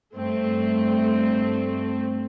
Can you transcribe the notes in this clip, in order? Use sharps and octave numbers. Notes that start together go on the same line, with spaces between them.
G2 A3 C4